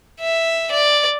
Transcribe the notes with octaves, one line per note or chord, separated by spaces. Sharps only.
E5
D5